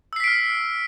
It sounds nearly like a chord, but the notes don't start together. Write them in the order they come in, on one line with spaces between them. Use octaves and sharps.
E6 C7 B6 D7 F6